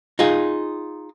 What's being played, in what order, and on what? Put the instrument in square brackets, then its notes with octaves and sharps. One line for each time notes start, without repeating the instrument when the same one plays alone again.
[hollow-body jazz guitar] D#4 F4 G#4